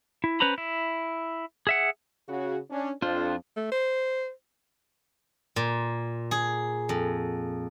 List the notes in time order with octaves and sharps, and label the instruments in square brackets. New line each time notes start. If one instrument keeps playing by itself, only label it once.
[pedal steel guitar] E4
C#4 B4 C5 A#5 B5
E4
G#4 E5 F#5
[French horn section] C#3 F#4
C#4 D4
[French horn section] F2 [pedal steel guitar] D4 F4 C5
[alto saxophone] A3
C5
[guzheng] A#2
G#4
F2